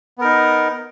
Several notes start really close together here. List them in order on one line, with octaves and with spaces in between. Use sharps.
B3 A#4 D#4